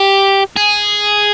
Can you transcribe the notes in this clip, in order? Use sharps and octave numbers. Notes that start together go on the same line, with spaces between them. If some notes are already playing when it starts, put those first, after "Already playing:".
Already playing: G4
G#4